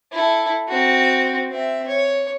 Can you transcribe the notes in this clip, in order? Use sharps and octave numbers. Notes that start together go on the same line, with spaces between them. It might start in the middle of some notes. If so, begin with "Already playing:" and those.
E4 A4
C4 F#4
C4 E5
C#5